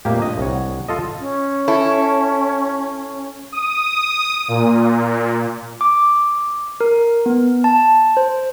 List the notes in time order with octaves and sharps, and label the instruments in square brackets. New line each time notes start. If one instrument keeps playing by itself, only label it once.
[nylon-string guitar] F2 A#2 F4 [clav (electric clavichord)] A3 A#3 G4
[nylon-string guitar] D4 [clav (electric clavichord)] D#5
[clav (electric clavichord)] C2 C#5
[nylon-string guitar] F#5
[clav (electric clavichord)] F4 A4 D#5
[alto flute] C#4
[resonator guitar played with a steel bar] E4 A4
[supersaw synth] D#6
A#2
[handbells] D6
A#4
B3
A5
C5